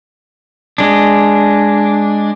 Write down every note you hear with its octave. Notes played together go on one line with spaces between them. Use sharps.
G#3 D4